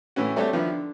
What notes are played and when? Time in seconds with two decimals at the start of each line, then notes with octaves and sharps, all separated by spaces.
0.16 A2 E3 C#4 F#4
0.36 G3 A3 C4 F#4 A4 C#5
0.53 D3 D#3 F3 B3 E4
0.69 D3